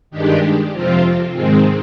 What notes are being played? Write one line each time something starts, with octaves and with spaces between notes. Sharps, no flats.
G2 D#3 G#3 D4 G4
F2 C3 F3 C4 F4
G#2 D#3 G#3 C4